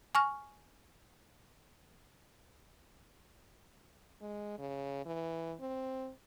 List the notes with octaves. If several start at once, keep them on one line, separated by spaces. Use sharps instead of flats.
G#5 C#6 F6
G#3
C#3
E3
C4